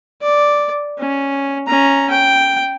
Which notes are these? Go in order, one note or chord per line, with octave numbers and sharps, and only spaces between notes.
D5
C#4
C#4 A#5
G5